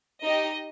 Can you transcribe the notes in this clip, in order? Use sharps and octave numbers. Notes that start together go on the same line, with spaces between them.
D#4 G4 D#5